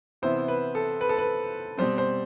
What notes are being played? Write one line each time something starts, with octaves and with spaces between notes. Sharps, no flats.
C3 E3 B3 E4 C5
B4
A4
B4
A4
B4
B2 G3 C4 C5
C5